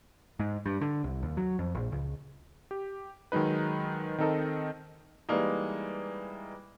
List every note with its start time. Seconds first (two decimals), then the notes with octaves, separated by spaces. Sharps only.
0.40 G#2
0.66 G2
0.81 D3
1.04 C2
1.23 D#2
1.37 F#3
1.59 F2
1.75 A#1
1.92 C#2
2.71 G4
3.32 D#3 F#3 G#3 D#4 B4
4.18 D#3 C4 D#4 A4 A#4 D#5
5.29 E3 G3 G#3 A#3 D#4